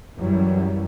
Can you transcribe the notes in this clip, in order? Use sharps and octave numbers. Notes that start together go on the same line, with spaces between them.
F#2 E3 F#3 G3